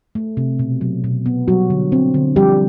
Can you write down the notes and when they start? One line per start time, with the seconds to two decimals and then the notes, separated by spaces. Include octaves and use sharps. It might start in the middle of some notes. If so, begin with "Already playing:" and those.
0.15 A3
0.37 C3
0.59 B2
0.81 F#3
1.04 B2
1.26 B3
1.48 F#3 G3 F#4
1.70 D3
1.92 C4
2.14 D3
2.36 F3 G3 G4